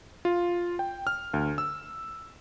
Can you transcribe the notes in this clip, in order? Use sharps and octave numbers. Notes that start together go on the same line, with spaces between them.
F4
G5
F6
D2
E6